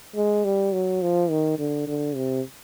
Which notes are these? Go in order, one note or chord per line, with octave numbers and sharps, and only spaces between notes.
G#3
G3
F#3
F3
D#3
D3
D3
C3